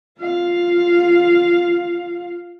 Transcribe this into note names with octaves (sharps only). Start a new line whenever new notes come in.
F4 F5